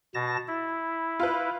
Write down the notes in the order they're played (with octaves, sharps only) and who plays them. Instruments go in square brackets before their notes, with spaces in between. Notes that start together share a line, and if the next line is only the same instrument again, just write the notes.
[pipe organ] B2 A5 A#6
E4
[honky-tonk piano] F4 B4